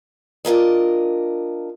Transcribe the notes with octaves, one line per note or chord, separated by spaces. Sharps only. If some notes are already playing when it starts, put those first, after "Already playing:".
D4 F4 A#4 D#5